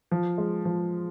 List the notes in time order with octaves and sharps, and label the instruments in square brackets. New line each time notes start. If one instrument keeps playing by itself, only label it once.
[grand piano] F3
G#3
F3